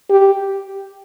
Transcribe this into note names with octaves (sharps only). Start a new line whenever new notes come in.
G4